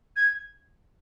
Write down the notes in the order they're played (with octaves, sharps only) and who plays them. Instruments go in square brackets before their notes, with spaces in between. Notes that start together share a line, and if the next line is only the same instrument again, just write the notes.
[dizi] G#6